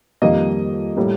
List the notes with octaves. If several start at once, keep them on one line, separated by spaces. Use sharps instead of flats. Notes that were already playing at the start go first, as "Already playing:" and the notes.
F2 D#3 G3 A#3 D#5
A2 G3 A#3